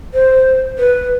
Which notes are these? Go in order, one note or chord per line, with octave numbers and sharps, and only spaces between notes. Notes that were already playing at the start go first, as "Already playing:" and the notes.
C5
B4